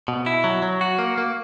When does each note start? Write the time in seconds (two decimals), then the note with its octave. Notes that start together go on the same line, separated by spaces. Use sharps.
0.08 B2
0.26 E4
0.44 F#3
0.62 F#3
0.81 F#4
0.99 A#3
1.18 A#3